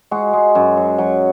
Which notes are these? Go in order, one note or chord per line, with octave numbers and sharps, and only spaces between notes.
G#3 F#4
G#3
F#2
F#3
F#3